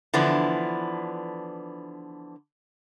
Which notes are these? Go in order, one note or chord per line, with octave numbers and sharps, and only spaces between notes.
D3 E3 F3 B3 D4 E4